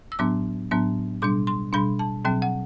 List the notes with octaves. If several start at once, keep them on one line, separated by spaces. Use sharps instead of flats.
E6
A2 F#3 B3 D4 D6
A2 F#3 B3 D4
B2 G3 D4 D6
C6
B2 G3 D4 B5
A5
B2 F#3 C4 G5
F#5